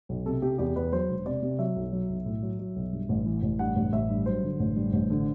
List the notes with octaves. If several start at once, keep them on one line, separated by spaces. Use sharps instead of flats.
B1
C3 A4
C3 G4
E2 G4
E2 B4
F#3 C5
E1
C3 D5
C3
F#3 E5
B1
F#3
B1
A2
F#3
F#3
B1
G2
A1
E3
A1
G2 F#5
A1
A1 E5
G2
F#3 C5
D3
A1
G2
A1
D3